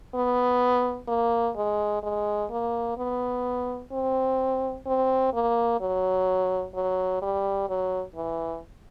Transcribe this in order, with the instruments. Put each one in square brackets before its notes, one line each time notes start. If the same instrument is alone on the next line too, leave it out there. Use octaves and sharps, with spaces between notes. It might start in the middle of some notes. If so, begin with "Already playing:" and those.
[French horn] B3
A#3
G#3
G#3
A#3
B3
C4
C4
A#3
F#3
F#3
G3
F#3
E3